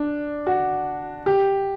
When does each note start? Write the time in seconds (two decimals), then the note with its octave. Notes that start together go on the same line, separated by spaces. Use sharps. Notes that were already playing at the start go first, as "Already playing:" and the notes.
Already playing: D4
0.47 F#4
1.26 G4